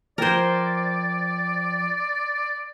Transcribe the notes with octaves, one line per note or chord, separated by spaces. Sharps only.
F3 A#4 C5 D5 G5 G#6